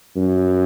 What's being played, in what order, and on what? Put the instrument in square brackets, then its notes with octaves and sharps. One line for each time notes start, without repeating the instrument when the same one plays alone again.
[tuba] F#2